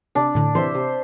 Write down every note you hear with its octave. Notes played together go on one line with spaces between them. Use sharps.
C3 D4
A2 D3
C3 E3 C5 E5
C3